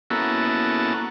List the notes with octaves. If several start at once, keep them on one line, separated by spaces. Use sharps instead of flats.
A#3 B3 C#4 E4 F#4 A4